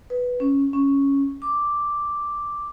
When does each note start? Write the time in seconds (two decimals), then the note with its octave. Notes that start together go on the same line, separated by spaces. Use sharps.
0.10 B4
0.40 C#4
0.73 C#4
1.42 D6